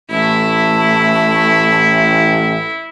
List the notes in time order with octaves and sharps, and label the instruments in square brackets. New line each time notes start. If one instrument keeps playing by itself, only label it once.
[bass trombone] A1 [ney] A3 [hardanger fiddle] E4